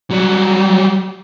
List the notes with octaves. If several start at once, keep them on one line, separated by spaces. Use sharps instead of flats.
F#3 G3